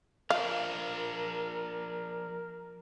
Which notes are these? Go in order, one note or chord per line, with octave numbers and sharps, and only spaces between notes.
F3 D4 A#4 F5